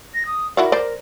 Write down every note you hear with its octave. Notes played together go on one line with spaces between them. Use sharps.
A#6
D#6
E4 F#4 A#4 D5
C5 D5